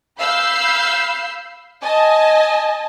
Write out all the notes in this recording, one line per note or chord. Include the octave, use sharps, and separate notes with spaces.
F5 B5 E6 G6 C7
D#5 G#5 A5